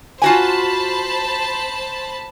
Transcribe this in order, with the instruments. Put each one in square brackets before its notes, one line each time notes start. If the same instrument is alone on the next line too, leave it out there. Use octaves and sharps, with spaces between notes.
[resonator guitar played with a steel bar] F4 F#4 G#5 [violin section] C5 A5 B5